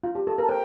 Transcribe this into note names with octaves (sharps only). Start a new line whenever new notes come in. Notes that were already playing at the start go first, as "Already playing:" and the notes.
F4
G4
A4
A#4 A5
C5 G5